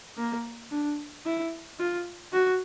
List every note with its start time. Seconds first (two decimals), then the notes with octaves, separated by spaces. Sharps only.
0.17 A#3
0.71 D4
1.26 E4
1.79 F4
2.32 F#4